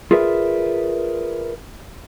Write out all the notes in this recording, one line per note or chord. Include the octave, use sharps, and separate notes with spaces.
F4 G#4 A#4 B4 D5 E5